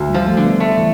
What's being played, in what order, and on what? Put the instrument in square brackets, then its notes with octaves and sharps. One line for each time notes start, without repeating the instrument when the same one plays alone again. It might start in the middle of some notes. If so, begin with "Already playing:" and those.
Already playing: [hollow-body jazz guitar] D2
[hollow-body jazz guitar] F3 [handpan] G3
[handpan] A3
[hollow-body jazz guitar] D3
[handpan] B3
[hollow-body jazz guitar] A3
[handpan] E3